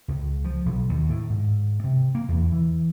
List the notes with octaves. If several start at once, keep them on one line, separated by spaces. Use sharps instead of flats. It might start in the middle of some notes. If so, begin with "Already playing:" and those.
C#2
F3
B1
D#2
A2
G#2
C3
A#3
E2
E3